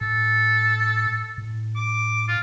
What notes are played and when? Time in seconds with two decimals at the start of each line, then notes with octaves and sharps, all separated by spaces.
0.01 A2 A4
1.38 A2
1.76 D6
2.28 F4